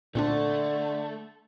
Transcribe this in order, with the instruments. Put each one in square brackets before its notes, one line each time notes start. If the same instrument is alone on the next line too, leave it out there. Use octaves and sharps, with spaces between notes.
[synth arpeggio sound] A#2 C4 D4 [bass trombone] D3 [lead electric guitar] A3